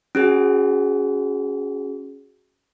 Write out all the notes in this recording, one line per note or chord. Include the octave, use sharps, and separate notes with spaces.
C#4 F#4 G#4